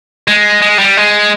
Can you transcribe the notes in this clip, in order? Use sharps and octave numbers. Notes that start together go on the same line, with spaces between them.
G#3
G#3
G3
G#3